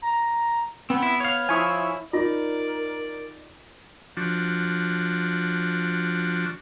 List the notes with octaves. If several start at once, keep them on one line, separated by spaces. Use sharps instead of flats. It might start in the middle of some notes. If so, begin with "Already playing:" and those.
A#5
B3 C4
E4
C#5 F5
F3 E4 G#5 C#6 D#6
D#4 F4 A#4 D5
F3 D4 F#4